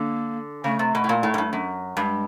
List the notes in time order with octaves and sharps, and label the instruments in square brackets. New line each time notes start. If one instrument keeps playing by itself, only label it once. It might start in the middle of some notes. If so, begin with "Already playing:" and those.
Already playing: [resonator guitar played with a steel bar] D3 [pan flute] A#3
[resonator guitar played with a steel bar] C#3 [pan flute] A3
[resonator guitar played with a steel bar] C3
B2
A2
A#2
A2
G#2
G2
F#2
[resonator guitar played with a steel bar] G2 [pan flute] G#3